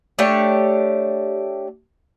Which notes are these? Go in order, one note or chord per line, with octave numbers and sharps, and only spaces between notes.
A3 D4 G4 C#5